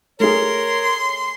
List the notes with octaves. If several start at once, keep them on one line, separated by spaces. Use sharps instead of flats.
A3 G#4 A#4 C#5 C6